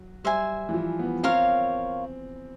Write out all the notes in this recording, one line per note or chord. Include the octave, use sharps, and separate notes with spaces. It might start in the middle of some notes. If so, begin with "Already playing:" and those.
Already playing: F#3
G3 C5 E5 G#5
E3
F3
B3
C4 F4 A#4 C#5 F5